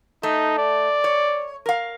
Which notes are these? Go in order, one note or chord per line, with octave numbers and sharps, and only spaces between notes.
A3 D#4
D5
C#5
A#4 F5